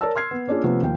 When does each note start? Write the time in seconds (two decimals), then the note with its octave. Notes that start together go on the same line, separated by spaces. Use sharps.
0.01 A#4 C#5 D5 A5 E6
0.15 C6 F6 G#6 C7
0.31 B3
0.48 A#3 C#4 D4 F4 G#4
0.63 C3 F3 A3 B3 C#4
0.82 D#2 F3 G5